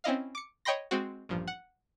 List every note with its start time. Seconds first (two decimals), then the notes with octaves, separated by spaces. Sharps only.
0.04 C4 C#4 E4 D#5 F5
0.35 D6 C#7
0.65 C#5 D#5 G5 B5 C6 A#6
0.91 G#3 C4 F#4
1.29 A1 G2 A#2 F3
1.48 F#5